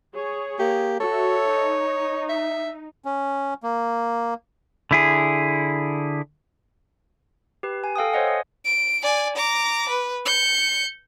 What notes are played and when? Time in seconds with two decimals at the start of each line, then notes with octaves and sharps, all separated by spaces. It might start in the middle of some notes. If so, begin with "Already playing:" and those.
0.14 G#4 C#5
0.59 A#3 G4
1.00 F#4 A4 C#5 E5
1.49 D#4
2.29 E5
3.05 C#4
3.63 A#3
4.91 D3 E4 G#4
7.63 G4 B4
7.84 G#5
7.96 A4 F5 G5 D#6
8.13 C5 C#5 D#5 F#5 G#5
8.27 D#6
8.65 D7
9.03 D5 G#5
9.36 A#5 D6
9.89 B4
10.25 G6 C#7